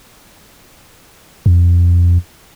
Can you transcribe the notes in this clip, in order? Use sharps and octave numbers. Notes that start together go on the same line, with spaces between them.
F2